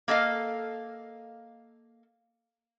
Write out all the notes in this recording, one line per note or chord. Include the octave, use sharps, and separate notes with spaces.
A#3 A4 D#5 F5